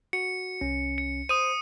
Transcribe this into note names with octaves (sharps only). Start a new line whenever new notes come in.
F#4 C#7
C2 C#4
C#7
C5 D#6 D#7